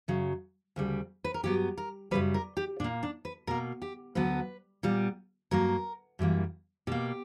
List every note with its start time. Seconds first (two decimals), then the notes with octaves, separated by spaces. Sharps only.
0.08 F#2 C#3 F#3
0.76 D2 C#3 G3
1.24 B4
1.34 A#4
1.43 G2 F#3 B3 G4
1.78 A#4
2.11 F#2 C#3 G3 B4
2.34 A#4
2.57 G4
2.80 A#2 A#3 D4
3.03 D4
3.25 B4
3.47 B2 A#3 A#4
3.82 G4
4.15 D2 D3 F#3 B3 B4
4.83 A#2 G3 B3
5.51 G2 F#3 A#3 A#4
6.19 F#2 E3 G3 A#3
6.87 B2 A#3 G4